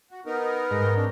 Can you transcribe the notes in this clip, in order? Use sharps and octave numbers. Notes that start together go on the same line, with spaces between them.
F#4
B3 D#4 A#4
G#2 A#6
C#5 G5
C4 D4 A#4